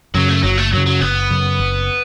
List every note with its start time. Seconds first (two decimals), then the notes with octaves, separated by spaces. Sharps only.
0.14 F#2 C#3 F#3
0.29 A3
0.43 F#1 F#3
0.58 A3
0.73 F#2 C#3 F#3
0.87 F#3
1.01 F#1 B3
1.30 F#2 C#3
1.60 F#1